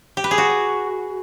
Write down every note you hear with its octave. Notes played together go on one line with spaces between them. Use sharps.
G4
B4
G#4
F#4